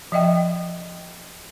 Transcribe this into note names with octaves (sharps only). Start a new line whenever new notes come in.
F3 D#5 E5 G5